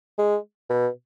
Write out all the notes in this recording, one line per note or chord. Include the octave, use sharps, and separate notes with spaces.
G#3
B2